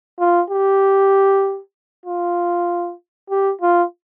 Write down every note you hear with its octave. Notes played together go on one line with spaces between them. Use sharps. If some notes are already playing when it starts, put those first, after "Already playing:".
F4
G4
F4
G4
F4